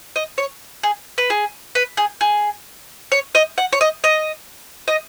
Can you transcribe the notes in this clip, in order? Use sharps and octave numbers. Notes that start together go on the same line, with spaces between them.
D#5
C#5
G#4
B4
G#4
B4
G#4
G#4
C#5
D#5
F#5
C#5
D#5
D#5
D#5